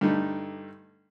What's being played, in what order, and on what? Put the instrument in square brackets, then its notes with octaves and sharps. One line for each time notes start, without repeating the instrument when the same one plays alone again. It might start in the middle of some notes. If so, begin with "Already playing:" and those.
[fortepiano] G2 D3 A3 D#4